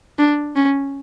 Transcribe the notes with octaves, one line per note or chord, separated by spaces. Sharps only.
D4
C#4